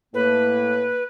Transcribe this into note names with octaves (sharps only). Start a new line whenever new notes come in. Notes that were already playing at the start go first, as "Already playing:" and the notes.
A2 A#3 B4